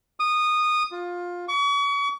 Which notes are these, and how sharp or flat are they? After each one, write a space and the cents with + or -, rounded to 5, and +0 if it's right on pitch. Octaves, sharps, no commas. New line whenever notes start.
D#6 -15
F4 +15
C#6 +40